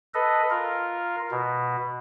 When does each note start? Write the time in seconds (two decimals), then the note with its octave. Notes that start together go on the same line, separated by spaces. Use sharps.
0.14 A4 B4 D#5
0.50 F4 A#4
1.31 B2